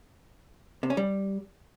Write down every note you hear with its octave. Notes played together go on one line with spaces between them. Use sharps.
C3
C#4
G3